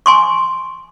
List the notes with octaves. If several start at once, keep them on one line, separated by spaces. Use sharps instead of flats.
G#5 C6 C#6